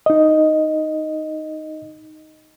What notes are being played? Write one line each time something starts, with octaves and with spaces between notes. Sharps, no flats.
D#4 D#5